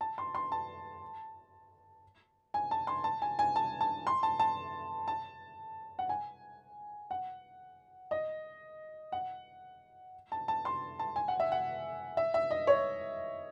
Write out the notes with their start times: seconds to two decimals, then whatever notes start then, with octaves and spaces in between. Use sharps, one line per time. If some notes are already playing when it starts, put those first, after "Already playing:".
0.01 A5
0.18 C6
0.35 C6
0.52 A5
2.54 G#5
2.71 A5
2.87 C6
3.04 A5
3.22 G#5
3.39 G#5
3.56 A5
3.81 A5
4.07 C6
4.23 A5
4.40 A5
5.08 A5
5.99 F#5
6.09 G#5
7.11 F#5
8.11 D#5
9.12 F#5
10.32 A5
10.48 A5
10.65 C6
10.99 A5
11.16 G#5
11.28 F#5
11.40 E5
11.52 F#5
12.17 E5
12.34 E5
12.51 D#5
12.67 C#5